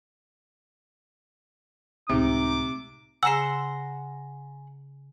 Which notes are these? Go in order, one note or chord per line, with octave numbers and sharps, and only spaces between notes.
C#2 A2 C3 D#4 D6
C#3 G#4 F#5 G#5 A#5 C6 E6 E7